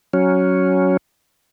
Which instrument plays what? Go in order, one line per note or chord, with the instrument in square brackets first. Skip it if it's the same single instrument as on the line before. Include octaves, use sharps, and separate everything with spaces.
[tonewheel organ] F#3 C#4